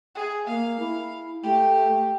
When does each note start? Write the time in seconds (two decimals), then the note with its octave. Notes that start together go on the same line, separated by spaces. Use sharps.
0.15 G#4
0.47 A#3 F5
0.80 E4
1.43 A3 G4